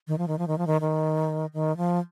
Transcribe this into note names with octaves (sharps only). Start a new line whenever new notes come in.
D#3
F3
D#3
F3
D#3
F3
D#3
D#3
D#3
F3